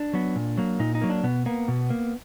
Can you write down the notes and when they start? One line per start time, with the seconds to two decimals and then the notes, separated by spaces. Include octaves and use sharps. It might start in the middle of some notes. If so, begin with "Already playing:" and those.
Already playing: D4
0.13 F#3 B3
0.36 A#2
0.58 F#3 A#3
0.79 A#2 D#4
0.95 D#4
1.01 F#3 A#3
1.10 D4
1.23 B2 B3
1.46 A#3 B3
1.68 B2
1.90 A#3